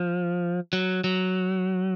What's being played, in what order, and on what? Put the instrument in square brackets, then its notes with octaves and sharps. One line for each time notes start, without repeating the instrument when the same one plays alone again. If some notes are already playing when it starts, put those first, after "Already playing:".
Already playing: [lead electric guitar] F3
F#3
F#3